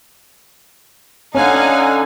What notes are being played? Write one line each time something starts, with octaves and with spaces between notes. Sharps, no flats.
D3 C#4 D#4 F5 F#5 G#5